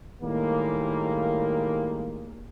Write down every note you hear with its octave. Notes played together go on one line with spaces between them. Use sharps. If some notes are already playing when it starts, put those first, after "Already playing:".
A2 D#3 G3 G#3 A#3